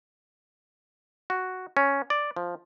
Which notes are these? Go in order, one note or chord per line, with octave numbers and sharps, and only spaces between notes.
F#4
C#4
D5
F3